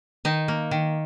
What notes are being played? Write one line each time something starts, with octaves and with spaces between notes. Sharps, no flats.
D#3 D#4
A#3
D#3